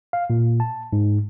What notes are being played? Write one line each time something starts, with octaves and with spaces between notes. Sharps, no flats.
F5
A#2
A5
G#2